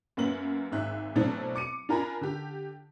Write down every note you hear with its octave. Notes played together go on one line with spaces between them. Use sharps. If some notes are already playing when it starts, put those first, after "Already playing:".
F#2 A#3 B3 F#7
G#1 G#2 E5 F#6
B2 E3 F#3 A3 C4 D4
D6 C#7 D#7
D4 F4 A#4 G#5 A#5 B5
D3 G4